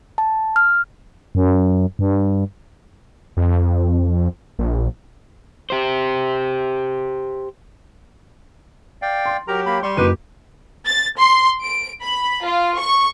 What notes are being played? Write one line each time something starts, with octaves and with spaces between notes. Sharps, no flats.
A5
F6
F#2
G2
F2
A#1
G4 C5
D5 F5 G5
C6
F#3 G4 A#4 A#5
A#3 B5
G3 C6 C#6
F#1 D#4 F#4 G4 B4 D#7
A6
C6
D7
B5
F4
C#6